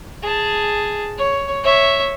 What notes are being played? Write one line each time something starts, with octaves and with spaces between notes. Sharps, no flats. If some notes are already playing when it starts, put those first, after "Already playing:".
G#4 A5
C#5
C#5 E5